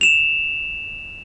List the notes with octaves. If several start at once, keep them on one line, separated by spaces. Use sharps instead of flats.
E7 F7